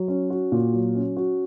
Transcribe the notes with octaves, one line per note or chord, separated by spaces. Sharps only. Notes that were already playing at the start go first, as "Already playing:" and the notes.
Already playing: F#3
C#4
F#4
A#2
F#3
C#4
F#4